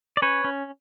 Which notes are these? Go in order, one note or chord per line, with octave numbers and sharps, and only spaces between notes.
D5
C#4 B4 C#5
C#4